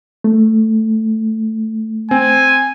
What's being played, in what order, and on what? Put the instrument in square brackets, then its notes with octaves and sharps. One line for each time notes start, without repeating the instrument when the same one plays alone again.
[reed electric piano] A3
[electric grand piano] C4 [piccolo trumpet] G#5